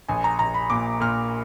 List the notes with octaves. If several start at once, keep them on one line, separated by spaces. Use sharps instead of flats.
A#1 G#5
A#5
A#1 A#5
B5
A#2 D6
A#2 F6